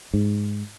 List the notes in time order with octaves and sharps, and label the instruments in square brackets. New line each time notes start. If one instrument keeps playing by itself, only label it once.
[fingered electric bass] G#2